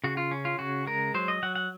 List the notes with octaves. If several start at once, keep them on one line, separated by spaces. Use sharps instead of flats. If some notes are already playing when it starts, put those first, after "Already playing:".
C#3 F#4
F4
C#4
F4
C#3 F#4
G#3 A#4
F#3 C5
D#5
F#3 F#5
F#5